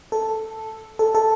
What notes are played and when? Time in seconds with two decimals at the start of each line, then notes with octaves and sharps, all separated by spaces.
0.12 A4
0.99 A4
1.15 A4